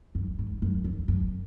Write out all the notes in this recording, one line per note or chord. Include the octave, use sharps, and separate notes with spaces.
F#2
G#2
F#2
F2
F#2